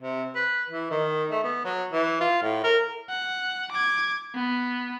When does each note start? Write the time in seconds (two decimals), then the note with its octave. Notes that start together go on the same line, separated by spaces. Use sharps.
0.01 C3
0.35 B4
0.70 E3
0.91 D#3
1.31 A3
1.44 B3
1.65 F#3
1.92 E3
2.20 F4
2.42 A2
2.64 A#4
3.09 F#5
3.72 D6 G#6
4.35 B3